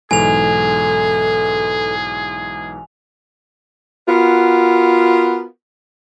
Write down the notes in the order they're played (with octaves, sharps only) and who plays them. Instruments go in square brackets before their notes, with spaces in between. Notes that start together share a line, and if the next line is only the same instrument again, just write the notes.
[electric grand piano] B1 G#2 E3 [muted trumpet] G#4 [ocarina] A4 [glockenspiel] G#5 F7
[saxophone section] B3 F4 F#4 A#4